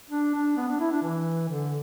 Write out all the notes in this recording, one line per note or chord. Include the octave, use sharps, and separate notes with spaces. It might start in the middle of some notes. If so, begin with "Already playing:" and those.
D4
D4
B3
D4
E4
D4
E3
D3